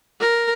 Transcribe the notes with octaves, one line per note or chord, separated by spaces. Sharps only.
A#4